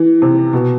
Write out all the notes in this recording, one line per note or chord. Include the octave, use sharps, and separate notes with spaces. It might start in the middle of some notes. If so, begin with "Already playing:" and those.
Already playing: E3
C3
B2